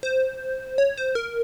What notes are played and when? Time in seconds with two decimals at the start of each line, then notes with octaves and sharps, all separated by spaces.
0.03 C5
0.78 C#5
0.97 C5
1.15 A#4